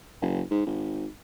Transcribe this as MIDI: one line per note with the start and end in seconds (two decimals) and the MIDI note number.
0.21 0.42 30
0.51 0.62 44
0.66 1.07 32